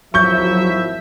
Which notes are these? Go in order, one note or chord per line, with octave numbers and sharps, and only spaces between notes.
G#1 F3 F#3 E4 E5 C#6 G6